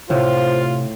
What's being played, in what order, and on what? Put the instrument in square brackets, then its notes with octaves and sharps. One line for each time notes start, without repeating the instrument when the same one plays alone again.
[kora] A2 [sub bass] C3 [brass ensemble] F4 [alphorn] C5